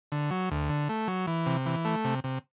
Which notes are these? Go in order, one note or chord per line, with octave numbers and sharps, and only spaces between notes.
D3
F#3
D2
D3
A3
F#3
E3
C3
E3
A3
C3
C3